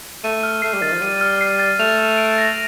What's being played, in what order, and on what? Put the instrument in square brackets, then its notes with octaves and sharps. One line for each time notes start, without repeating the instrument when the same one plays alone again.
[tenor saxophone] A3 [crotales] D#7
[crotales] F6
[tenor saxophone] A3 [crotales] C7
[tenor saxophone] G3
[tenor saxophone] D#3 [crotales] A6
[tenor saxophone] F3
[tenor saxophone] G3 [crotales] D#7
[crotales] F6
C7
A6
[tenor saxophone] A3 [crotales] F7
[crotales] F6
D7
A#6